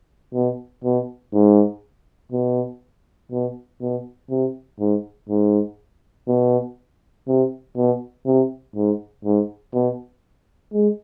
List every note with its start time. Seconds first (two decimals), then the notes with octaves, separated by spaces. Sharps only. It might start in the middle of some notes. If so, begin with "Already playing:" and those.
0.34 B2
0.84 B2
1.34 G#2
2.32 B2
3.32 B2
3.82 B2
4.30 C3
4.79 G#2
5.29 G#2
6.28 B2
7.28 C3
7.77 B2
8.26 C3
8.76 G#2
9.25 G#2
9.74 B2
10.73 G#3